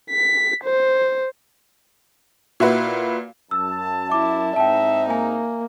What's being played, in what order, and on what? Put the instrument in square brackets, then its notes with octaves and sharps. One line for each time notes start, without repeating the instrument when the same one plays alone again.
[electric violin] B6
C5
[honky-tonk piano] A#2 E4 F#4 B4
[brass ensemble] F#2 A5 [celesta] E6
[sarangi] E4 [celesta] D6
[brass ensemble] G#2 C4 D#4 [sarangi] E5 [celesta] G5 A5
[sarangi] A#3 [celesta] G#5